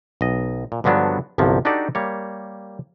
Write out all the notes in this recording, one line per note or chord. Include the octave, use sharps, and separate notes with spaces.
B1 D#5
A#2
G2 D3 F3 F#3 B3 D4
G1 C2 C3 F3 F#3
D4 D#4 F#4 G4 A4 D5
G3 A#3 C#5